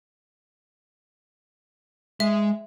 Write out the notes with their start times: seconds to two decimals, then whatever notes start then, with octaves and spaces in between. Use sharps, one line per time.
2.20 G#3 E5